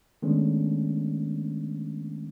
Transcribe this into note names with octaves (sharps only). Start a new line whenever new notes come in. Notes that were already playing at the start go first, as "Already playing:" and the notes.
D#3 G#3 A3 B3 C#4 D4